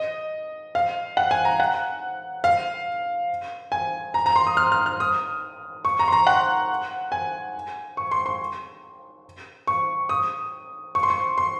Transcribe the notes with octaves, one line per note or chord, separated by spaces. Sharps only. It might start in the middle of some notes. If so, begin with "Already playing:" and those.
Already playing: D#5
F5
F#5
G#5
A#5
F#5
F5
G#5
A#5
A#5
C6
D#6
F6
F6
F6
D#6
C#6
A#5
C6
A#5
F#5
G#5
C#6
C6
C6
C#6
D#6
C#6
C6
C#6
C6